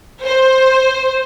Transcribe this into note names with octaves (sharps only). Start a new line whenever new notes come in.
C5